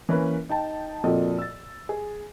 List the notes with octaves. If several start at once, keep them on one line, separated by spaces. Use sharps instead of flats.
E3 A#3 C#4 B4
D#4 G5 A5
F2 A#2 F3 F#4 A4 D#5
E6 A6
G#4